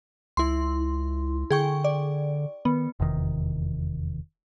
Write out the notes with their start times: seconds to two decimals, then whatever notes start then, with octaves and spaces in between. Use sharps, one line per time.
0.37 C#2 E4 C6
1.51 D3 G#4 G5 C#6
1.84 D5
2.65 D#3 B3
3.00 F1 E2 C3 D#3